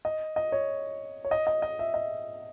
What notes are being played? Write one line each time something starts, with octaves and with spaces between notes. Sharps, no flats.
D#5
D#5
C#5
C#5
D#5
D#5
D#5
E5
D#5